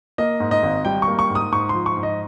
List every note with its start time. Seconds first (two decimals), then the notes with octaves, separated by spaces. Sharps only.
0.18 A#3 D#5
0.40 G#2
0.51 D#5
0.63 G#1
0.85 G3 G5
1.02 C#6
1.08 A#3
1.19 C#6
1.30 G#2
1.35 D#6
1.52 G#2 C#6
1.69 C6
1.74 F3
1.86 C#6
1.97 G#2
2.03 D#5